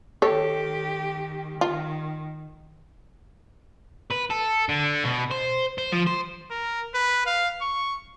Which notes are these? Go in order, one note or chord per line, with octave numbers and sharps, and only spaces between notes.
D#3 G4 A4 C#5
D#3 F4
B4
A4
D3
B2
C5
C5
F3
C5
A#4
B4
F5
C#6